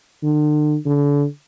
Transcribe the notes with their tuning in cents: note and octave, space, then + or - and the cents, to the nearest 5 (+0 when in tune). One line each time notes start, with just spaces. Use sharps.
D3 +40
D3 -35